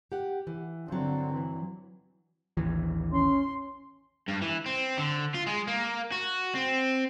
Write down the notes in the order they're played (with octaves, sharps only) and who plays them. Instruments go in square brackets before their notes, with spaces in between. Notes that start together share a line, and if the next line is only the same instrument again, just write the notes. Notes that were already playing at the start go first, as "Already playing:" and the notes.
[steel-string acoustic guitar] G4 F#5
E3
[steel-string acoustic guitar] G2 F#3 [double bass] D3 C4
[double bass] E3
[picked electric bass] A1 D#2 E3
[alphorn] C#4 [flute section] C6
[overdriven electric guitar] G2
E3
C4
D3
F4
G#3
A#3
F#4
C4